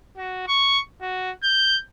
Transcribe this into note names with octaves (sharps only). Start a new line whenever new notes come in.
F#4
C#6
F#4
G6